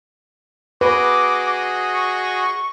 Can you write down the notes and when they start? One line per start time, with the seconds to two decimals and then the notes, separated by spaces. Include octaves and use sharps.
0.81 F#4 G#4 B4 D#5 D6
1.93 C#6